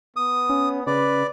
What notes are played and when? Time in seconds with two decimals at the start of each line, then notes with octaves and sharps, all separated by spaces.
0.16 B3 D#6
0.49 C#4
0.87 C#3 B4 D5